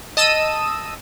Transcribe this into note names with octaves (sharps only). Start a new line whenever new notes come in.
D#5 A5 D#6 E6 D#7